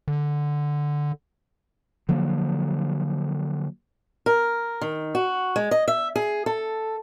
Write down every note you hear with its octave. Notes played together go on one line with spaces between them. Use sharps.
D3
D3 F3 F#3 A#3
A#4
D#3
F#4
G#3
D#5
E5
G#4
A4